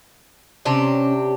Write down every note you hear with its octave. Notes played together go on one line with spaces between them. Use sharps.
C3 C#4 D4 G4